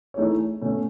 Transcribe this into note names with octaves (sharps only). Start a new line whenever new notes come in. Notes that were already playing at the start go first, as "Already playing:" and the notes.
E3 A3 D#4 G#4 C#5
B2 A3 C#4